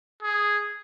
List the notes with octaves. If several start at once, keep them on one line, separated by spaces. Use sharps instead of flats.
G#4